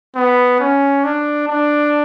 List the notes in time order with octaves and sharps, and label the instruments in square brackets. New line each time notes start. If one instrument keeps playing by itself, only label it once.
[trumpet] B3
C#4
D4
D4